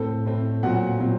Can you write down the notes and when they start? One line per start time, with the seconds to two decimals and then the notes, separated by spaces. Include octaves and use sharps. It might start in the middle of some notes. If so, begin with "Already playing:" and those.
Already playing: A2 A3 C4 A4
0.26 A2 A3 C4
0.63 A#2 F#3 C4 F#5
1.00 A#2 F#3 C4